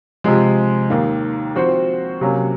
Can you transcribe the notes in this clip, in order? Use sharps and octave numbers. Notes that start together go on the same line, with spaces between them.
C3 F3 G#3
D#2 D#3 A#3
F3 C4 F#4 C5
C3 F#3 A#3 C#4